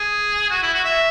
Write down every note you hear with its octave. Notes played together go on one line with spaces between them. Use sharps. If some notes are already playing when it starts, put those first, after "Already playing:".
Already playing: G#4
F#4
E4
F#4
E5